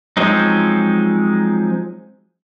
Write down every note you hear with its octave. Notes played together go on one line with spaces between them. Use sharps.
F3 F#3 G#3 C4 D#4